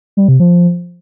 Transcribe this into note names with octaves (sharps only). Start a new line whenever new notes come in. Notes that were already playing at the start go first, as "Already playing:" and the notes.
G3
C3
F3